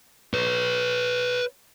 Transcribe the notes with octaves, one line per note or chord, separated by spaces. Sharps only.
B4 C#5